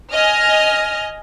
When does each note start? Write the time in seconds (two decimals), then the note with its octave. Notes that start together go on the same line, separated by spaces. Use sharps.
0.12 D#5 G#5 F6